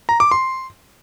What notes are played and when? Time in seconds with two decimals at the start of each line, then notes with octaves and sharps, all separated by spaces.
0.09 A#5
0.20 D6
0.31 C6